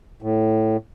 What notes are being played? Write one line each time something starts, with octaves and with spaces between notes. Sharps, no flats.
A2